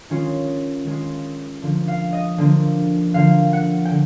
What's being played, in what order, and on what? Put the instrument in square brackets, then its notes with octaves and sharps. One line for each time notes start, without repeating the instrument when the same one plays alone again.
[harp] D#3 G#3 C#4 F4
D#3 G#3 C#4 F4
D3 F3 A#3
F5
D#5
D3 F3 A#3
D3 F3 A#3 F5
F#5
G5
D3